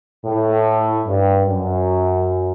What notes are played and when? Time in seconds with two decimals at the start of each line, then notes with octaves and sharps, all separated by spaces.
0.25 A2
1.06 G2
1.46 F#2